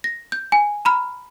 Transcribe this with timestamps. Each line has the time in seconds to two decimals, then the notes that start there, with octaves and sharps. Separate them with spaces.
0.04 A#6
0.32 G6
0.52 G#5
0.85 A#5 B5 F6